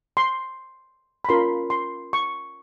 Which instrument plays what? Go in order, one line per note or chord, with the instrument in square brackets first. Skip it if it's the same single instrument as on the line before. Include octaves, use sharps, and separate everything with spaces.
[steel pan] C6
B5
C#4 F4 A#4 C6
C6
C#6